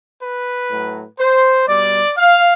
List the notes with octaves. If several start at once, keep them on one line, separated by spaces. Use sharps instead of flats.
B4
A2 F#3
C5
B2 G3 D5
F5